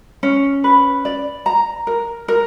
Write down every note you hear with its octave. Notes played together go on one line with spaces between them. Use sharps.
C#4
B4
D5
A#5
A#4
A#4